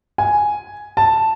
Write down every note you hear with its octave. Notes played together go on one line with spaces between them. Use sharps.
G#5
A5